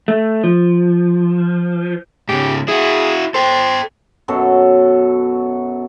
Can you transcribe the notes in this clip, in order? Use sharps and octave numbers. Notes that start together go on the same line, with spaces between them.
A3
F3
G#2 C#3 G4
E4 F#4 G#4
A4 C5 G5
F#2 B2 F#3 A4